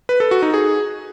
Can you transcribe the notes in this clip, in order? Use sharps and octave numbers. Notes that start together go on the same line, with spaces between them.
B4
A4
F#4
D#4
G#4